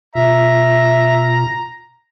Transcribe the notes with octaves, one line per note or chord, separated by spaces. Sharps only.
B2 F4 E5 A#5